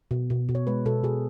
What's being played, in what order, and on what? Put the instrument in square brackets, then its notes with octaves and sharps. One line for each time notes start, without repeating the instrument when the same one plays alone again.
[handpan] B2
B2
B2
C#5
G#3 B4
B2 A4
B2 G#4